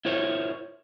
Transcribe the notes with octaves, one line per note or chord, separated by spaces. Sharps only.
E4 F4 A#4 C5 C#5